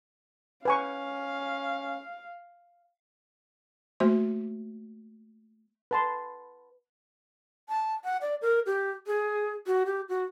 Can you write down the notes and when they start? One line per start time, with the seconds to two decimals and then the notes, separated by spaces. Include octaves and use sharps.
0.65 C#4 B4 F5 G#5 C#6
4.00 A3 A#3 F#4 C5 E5 C6
5.91 B4 A5 C6
7.69 A5
8.04 F#5
8.21 D5
8.42 A#4
8.66 G4
9.07 G#4
9.67 F#4
9.86 G4
10.09 F#4